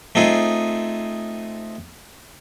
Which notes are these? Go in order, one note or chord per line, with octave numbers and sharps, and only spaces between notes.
A3 C4 D#4 F4 G#4